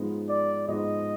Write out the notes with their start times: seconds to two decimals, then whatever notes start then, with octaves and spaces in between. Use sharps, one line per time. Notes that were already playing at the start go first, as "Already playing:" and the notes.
Already playing: G#2 F3 G#3 B3 D#4
0.29 D5
0.68 G#2 F3 G#3 B3 D#4 D#5